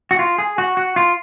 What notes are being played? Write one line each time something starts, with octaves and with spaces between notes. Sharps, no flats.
F#4
F4
G#4
F#4
F#4
F4